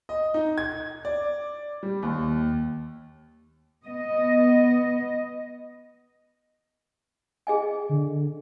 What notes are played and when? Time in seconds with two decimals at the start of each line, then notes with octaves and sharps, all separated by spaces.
0.09 D#5
0.34 D#4
0.58 G#6
1.05 D5
1.83 G3
2.02 D#2
3.86 B3 D#5
7.47 G#4 D#5 G#5
7.89 D3